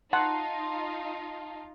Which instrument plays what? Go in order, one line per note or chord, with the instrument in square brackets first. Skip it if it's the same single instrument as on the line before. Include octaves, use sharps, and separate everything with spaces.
[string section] D#4 F4 [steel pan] F#5 [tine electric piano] A5 [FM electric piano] A#5 C6